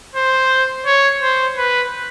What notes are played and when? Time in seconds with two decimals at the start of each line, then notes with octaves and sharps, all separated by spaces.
0.16 C5
0.86 C#5
1.22 C5
1.57 B4